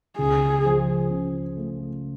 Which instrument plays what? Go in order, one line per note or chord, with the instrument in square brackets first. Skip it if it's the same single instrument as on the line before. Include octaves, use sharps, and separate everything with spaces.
[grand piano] C#2 [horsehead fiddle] G#4
[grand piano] F3
C#3
A3